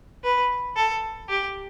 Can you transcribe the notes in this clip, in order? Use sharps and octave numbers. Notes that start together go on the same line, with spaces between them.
B4
A4
G4